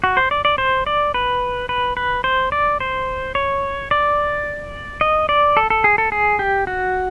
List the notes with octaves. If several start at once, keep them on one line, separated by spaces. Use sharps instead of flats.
F#4
C5
D5
D5
C5
D5
B4
B4
B4
C5
D5
C5
C#5
D5
D#5
D5
A4
A4
G#4
A4
G#4
G4
F#4